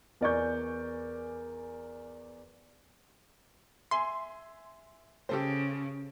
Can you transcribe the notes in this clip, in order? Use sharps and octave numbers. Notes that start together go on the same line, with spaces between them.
E2 A#4 D5 G#5 C#6 G6
E5 G#5 C6
C#3 G4 A4 C5